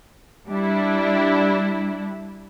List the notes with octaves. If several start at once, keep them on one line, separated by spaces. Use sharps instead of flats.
G3 D4 E4